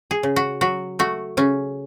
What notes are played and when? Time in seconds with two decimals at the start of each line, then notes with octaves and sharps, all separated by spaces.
0.11 G#4
0.23 C#3
0.36 F#4
0.61 F#3 F#4
0.99 A3 F#4
1.37 C#3 C#4